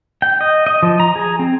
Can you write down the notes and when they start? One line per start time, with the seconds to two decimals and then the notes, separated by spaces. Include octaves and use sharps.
0.22 G5
0.41 D#5
0.67 D#5
0.83 F3
1.00 A#5
1.16 G#4
1.39 C4